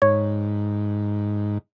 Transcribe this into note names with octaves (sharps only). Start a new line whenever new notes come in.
G#2 C#5